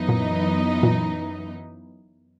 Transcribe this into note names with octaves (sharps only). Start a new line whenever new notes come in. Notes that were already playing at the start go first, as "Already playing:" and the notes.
Already playing: F#2 E3 B3 D#4
A#2
A#2